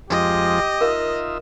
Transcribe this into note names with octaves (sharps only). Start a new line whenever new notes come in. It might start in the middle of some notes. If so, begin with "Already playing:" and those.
F2 F3 G#3 G4 D#5
D#4 F4 A#4 E5 F5